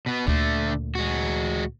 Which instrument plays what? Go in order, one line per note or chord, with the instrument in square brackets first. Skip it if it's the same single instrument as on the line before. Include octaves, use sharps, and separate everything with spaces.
[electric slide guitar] B2 B3
[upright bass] D2 A#2 [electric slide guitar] D3 A3
[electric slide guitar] G#3 F#4